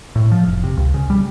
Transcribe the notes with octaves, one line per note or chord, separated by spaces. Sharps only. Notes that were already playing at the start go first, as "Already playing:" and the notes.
A2
F3
F1
C3
C#2
C#3
G3